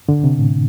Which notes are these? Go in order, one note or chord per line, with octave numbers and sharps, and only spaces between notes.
D3
C3
A2